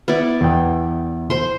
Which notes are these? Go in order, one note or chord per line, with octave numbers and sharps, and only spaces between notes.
B3 E4 D5
E2 G5
C5 C6